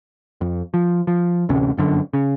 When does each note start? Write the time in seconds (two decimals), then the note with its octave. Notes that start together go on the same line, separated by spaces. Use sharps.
0.41 F2
0.74 F3
1.07 F3
1.49 A1 D2 C3 C#4
1.77 G1 F#2 D3
2.13 C#3